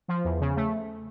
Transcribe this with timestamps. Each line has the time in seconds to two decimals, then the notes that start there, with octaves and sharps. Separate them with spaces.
0.08 F3
0.25 E2
0.41 C#3
0.56 A3